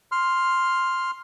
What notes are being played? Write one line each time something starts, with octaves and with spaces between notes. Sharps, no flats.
C6 F6